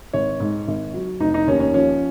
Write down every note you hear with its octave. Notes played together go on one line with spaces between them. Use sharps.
G#1 C#5
G#2
G#1
F#3
F1 D#4
D#4
D#2 C#4
C#4
F3 C#4